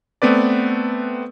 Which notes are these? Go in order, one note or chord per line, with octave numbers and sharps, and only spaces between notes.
A3 B3 C4 B4 D5